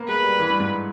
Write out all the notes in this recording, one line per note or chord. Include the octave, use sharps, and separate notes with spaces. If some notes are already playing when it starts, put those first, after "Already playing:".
Already playing: A#3 B3
G#3 B4
G3
E3
G2
G#2